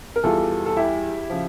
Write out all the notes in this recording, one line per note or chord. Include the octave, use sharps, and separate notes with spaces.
A#4
E2 E3 G3 F4 A4
A4
E4 G4
C#3 F3